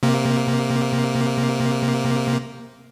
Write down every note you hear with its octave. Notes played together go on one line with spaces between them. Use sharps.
C3 A#3